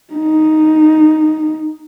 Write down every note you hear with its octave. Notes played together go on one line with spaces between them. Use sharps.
D#4